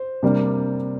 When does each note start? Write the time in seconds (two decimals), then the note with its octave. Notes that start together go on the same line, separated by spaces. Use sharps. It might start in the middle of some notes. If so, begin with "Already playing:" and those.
Already playing: C5
0.23 C3 G3 A#3 D4